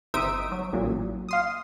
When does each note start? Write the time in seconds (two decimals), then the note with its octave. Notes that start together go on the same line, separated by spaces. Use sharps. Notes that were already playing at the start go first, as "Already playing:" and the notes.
0.14 G1 C4 D#4 E5 D#6 D7
0.52 F#3
0.73 A1 A#2 F#3
1.29 F5 C6 D#6